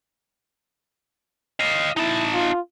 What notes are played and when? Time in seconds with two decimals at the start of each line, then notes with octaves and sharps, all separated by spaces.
1.60 D#5 F5
1.97 D#4 E4 A5
2.33 F4